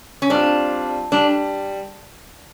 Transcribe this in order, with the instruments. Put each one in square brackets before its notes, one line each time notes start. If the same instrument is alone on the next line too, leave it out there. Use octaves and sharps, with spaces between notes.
[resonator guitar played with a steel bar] C#4
[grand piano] G3 C4 F4 [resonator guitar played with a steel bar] D4
[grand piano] G3 [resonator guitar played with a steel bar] D4